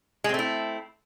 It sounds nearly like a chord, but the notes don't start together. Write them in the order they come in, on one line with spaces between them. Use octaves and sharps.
G#3 C4 A3 E4